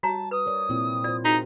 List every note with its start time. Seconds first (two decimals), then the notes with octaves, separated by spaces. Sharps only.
0.03 G3 F#4 C#5 A5 A#5
0.31 B4 D#6
0.46 A#4 C#5 D5
0.69 A#2 C4 E4
1.04 F4 C5 D5
1.25 D#4 F#4 G#4 A#4